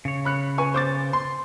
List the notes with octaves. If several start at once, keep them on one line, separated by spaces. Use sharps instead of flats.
C#3 C#5
B5 F#6 C#7
B4 G#5 C#6
C5 D6 A6
C6